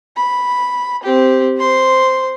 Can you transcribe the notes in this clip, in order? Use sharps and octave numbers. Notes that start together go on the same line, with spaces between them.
B5
C4 G4
C5 C6